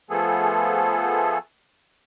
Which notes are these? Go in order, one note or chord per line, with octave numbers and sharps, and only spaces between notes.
F3 A3 B3 G#4 A4